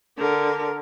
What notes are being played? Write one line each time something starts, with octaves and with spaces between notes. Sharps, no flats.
D3 A#4